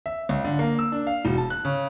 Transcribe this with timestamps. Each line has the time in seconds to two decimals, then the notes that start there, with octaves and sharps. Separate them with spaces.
0.06 E5
0.29 C#2
0.45 D3
0.59 A#3
0.79 E6
0.92 D4
1.07 F5
1.25 E1
1.38 A5
1.50 F#6
1.65 C#3